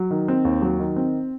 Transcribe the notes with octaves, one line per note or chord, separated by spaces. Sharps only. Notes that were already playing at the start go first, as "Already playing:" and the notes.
Already playing: F#3
D#3
C4
D#2
F#3
D#3
C4